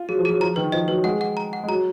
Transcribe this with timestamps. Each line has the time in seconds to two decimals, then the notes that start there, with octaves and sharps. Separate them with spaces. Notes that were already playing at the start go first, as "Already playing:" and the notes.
Already playing: F4
0.09 F#3 G#4
0.19 F3
0.25 F#3 G#4
0.40 F3 A#5
0.56 D#3 B4
0.72 F3 D#5
0.88 F#3 B4
1.04 G#3 F#5
1.21 F#5
1.37 A#5
1.53 F#5
1.64 G#3
1.68 F#3 A#5